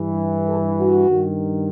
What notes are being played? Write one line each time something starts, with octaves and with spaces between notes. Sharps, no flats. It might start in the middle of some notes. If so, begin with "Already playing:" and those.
Already playing: G2 E3
A4
F#4
G2 D#3